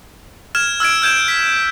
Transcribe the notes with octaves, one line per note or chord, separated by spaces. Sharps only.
F6 G#6 E7
E6 F6 G#6 D7
F6 G6 G#6 E7
B6